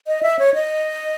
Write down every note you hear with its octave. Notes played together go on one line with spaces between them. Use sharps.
D#5
E5
C#5
D#5